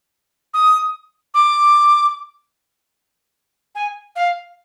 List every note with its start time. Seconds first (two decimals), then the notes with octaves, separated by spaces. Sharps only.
0.54 D#6
1.34 D6
3.75 G#5
4.16 F5